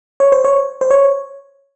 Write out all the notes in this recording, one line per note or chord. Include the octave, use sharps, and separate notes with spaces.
C#5
C5
C#5
C5
C#5